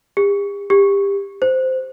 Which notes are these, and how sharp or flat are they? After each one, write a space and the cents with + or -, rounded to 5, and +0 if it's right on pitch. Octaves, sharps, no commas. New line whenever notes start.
G4 +45
G4 +25
C5 -10